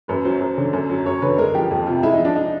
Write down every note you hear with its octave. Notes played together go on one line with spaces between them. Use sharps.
F#2 B4
F#3 C5
F#2
D3
F#2
F#3
F#2 C#5
D3 B4
G#3 A#4
F3 G4
F2
C3 F4
G#3 E4
D#4
F3
D4
D#4